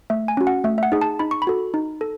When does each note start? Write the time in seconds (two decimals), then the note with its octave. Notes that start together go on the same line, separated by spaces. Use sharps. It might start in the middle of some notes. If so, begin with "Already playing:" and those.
0.10 A3 E5
0.28 G#5
0.37 C#4 F#4
0.47 F#5
0.64 A3 E5
0.78 E5
0.83 F#5
0.92 D#4 G#4
1.01 A5
1.19 D#4 B5
1.31 C#6
1.42 B5
1.47 F#4 A4
1.74 D#4
2.01 A4